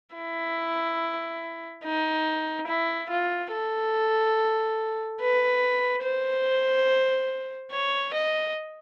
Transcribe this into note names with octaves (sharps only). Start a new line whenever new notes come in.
E4
D#4
E4
F4
A4
B4
C5
C#5
D#5